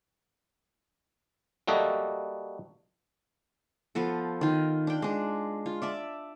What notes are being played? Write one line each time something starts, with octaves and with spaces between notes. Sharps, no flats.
G3 A#3 F#4 A4 D#5 E5
F3 B3 A4
D#3 F4
D4 G5
G#3 D4
F4
D5 E5 A5